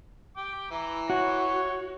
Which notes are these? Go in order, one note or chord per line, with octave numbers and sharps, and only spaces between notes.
G5 D6
E3 E4 A#5
F#4 C#5